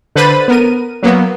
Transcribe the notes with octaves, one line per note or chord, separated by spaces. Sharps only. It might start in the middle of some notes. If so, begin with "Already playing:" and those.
D3 B4 C5 B5 A6 D#7
B3 A#4 D#7
F#3 A#3 B3